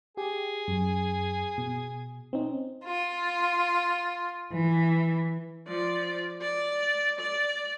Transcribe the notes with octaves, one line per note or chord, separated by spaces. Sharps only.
G4 G#4
F#2
B2
C4 C#4 D#4
F4
E3
F3 D5
D5
D5